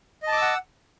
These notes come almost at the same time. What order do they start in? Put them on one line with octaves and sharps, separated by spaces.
D#5 A5 D6 E6 F#5